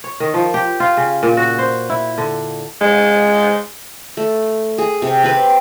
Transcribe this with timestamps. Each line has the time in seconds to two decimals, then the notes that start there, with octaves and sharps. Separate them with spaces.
0.04 C#5
0.20 D#3
0.34 F3
0.54 G4
0.80 F4
0.97 C#3
1.23 A#2
1.37 F#4
1.58 C5
1.90 E4
2.18 D3
2.81 G#3
4.17 A3
4.78 G#4
5.02 C3
5.23 C4 G4 B4